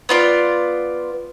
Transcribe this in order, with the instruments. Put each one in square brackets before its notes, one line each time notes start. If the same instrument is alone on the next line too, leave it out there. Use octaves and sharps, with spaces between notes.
[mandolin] B3 F4 D5